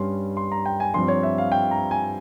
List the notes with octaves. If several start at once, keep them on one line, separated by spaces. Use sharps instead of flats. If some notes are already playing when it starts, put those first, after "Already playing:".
Already playing: G2 G3 C#4 C6
C6
A#5
G5
G#5
G2 F3 C4 C6
C#5
E5
F5
G5
A#5
G#5